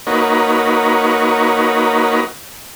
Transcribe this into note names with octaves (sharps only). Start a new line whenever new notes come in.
A#3 D#4 F#4 B4 C#5